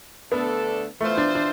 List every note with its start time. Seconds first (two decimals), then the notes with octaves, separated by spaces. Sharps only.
0.32 D3 A3 B3 D4 A4
1.01 E3 A3 B3 F4 C5 E5
1.17 D4
1.35 D4